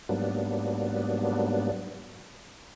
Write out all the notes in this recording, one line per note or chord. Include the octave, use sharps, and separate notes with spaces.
G#2 F#3 G3 A#3 B3 D4